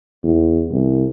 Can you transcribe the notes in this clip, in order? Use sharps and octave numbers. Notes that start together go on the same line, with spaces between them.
E2
C2